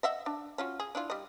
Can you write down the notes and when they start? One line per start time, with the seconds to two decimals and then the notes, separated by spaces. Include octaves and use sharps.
0.03 D#5 E5 F#5
0.26 D4
0.58 C#4 F4 F#4
0.80 G#4
0.95 D4 E4 F4
1.10 G3 D#5